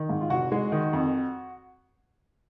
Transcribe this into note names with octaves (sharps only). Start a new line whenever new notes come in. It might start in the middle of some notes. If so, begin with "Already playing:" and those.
Already playing: D#3
G#2
F4
F1 F#4
G#3
D#3
F2